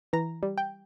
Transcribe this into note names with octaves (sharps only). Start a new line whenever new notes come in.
E3 A#5
G3
G5